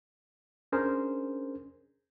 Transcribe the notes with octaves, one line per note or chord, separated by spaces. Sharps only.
C#4 D4 G#4 A#4 C5